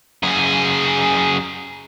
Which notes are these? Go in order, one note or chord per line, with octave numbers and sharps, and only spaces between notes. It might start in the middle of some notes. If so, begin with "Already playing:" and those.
F#2 G#4